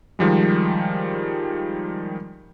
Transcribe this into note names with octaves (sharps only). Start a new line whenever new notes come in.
D#3 F3 G3 G#3